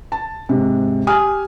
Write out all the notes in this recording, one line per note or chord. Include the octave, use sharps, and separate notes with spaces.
A5
G#2 C3
G4 G#5 D#6 F6